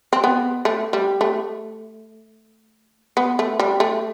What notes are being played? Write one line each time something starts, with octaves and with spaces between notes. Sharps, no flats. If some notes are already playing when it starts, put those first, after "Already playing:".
C4
B3
A3
G3
A3
B3
A3
G3
A3